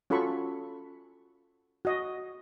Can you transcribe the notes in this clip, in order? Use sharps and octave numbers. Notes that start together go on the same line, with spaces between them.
C#4 F4 F#4 A4 B5 C#6
F#4 D#5